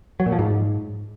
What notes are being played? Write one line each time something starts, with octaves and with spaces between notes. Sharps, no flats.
F#3
A#2
F3
G#2